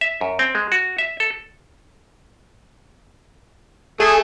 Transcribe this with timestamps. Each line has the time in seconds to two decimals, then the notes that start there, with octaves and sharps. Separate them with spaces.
0.01 E5
0.21 F#2
0.39 C4
0.55 G#3
0.72 F#4
0.98 E5
1.20 A4
4.00 A3 G#4